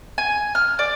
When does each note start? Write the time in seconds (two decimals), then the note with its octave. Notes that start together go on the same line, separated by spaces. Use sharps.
0.18 G#5
0.55 F6
0.79 D5